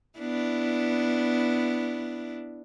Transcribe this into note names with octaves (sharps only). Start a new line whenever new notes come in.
B3 D4 E4